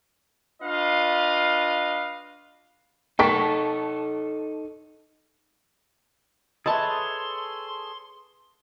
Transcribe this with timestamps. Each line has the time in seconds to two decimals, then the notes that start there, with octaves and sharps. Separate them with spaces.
0.63 D4 F4 B4 D#5 F5
3.19 D#4 A4 A#4 G5 A5 A#5 C#6 B6
6.66 G#4 A4 B4 C#5 D#5 E5 A5 C6